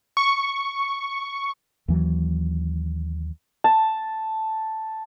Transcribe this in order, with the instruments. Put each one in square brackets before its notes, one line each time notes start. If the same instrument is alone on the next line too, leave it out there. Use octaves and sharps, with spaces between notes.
[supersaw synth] C#6
[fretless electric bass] D#2 E3 F#3
[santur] A5